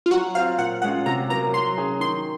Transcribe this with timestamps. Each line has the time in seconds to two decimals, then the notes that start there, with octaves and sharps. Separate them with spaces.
0.06 F4
0.11 F#3 F#4
0.35 C4 F4 F5
0.58 A#2 F#5
0.82 G#3 C#4 F4 F#5
1.06 C3 A#5
1.29 F#3 A#3 A#5
1.53 F#3 C6
1.78 C#4 G#4
2.00 D#3 C6